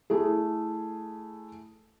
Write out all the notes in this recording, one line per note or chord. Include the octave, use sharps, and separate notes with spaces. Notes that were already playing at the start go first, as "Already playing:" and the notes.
A3 E4 G#4